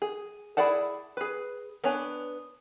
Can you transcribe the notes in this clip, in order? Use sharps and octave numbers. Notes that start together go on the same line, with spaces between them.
G#4
E4 G#4 D5 F#5 A5
G#4 B4
B3 D4 C#5 G#5